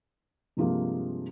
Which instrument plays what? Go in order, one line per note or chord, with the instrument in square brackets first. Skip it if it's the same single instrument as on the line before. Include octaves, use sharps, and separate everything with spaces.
[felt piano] G2 C3 F3 G#3 A#3